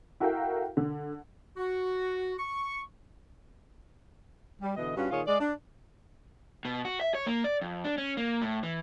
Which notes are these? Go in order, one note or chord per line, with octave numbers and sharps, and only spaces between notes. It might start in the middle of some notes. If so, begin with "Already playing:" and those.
E4 F#4 A4 A#4 F5 G5
D3
F#4
C#6
G3
B2 D3 E3 D#5
G2 C#4 F4 F#4
A#2 D#3 F4 G#4 C#5
G#3 D5
D4
B2
F#4
E5
C#5
A#3
D5
F2
D4
C#4
A#3
A2
E3